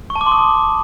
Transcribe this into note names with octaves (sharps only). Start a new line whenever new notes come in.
C#6
A5
D6
C6
D#6